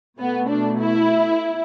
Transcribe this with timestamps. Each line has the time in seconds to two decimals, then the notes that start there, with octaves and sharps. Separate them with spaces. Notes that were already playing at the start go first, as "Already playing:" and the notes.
0.19 B2 A3 B3
0.49 D4
0.79 E4